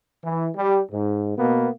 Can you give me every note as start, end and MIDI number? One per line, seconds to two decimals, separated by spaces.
0.23 0.45 52
0.54 0.79 55
0.91 1.31 44
1.36 1.68 47
1.36 1.68 58
1.36 1.68 59